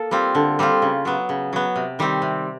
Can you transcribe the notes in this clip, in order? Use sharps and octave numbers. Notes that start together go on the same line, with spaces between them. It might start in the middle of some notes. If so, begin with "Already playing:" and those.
Already playing: A#3 A4
G3 C4 F4
D3
G3 C4 F4
C#3
F#3 B3
C#3
F#3 B3
C3
D#3 G3 C4
C3